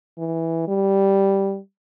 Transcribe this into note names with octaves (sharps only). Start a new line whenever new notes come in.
E3
G3